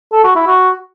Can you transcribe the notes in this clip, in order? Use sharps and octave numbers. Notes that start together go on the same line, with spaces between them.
A4
F#4
E4
F#4